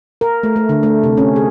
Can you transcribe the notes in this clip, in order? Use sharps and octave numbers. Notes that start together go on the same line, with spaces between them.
A#4
A3
A3
D3
A3
C3
C#4
G#4